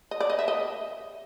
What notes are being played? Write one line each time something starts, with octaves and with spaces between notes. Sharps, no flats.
D#5
D5
D#5
E5
D#5